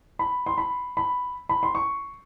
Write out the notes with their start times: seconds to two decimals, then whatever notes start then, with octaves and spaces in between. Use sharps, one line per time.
0.19 B5
0.46 C6
0.58 B5
0.97 B5
1.49 B5
1.63 C6
1.75 C#6